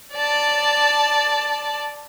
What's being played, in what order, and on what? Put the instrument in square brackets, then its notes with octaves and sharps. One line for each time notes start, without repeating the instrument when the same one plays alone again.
[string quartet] D5 A5